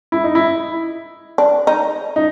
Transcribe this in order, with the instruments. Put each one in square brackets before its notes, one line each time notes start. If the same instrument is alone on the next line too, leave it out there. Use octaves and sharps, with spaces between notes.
[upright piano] E4
D#4
E4
[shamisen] D4
D#4
[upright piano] D#4